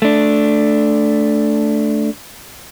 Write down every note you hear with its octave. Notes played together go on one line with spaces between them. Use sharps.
A3 D4